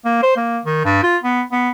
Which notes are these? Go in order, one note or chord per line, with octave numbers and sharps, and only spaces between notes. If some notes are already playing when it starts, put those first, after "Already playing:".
A#3
C5
A#3
D#3
G2
F4
B3
B3